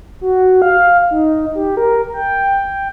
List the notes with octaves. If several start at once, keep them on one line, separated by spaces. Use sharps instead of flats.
F#4
F5
D#4
G4
A#4
G5